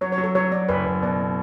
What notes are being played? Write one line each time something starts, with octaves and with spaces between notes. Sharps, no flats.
F#3 C#5
C#5
F#3
A4
F#3 C#5
F#3 D5
F#1 B4
F#1
B2 D5
B2